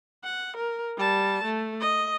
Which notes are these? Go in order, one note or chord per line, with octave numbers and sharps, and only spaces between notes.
F#5
A#4
G3 A5
A3
D#5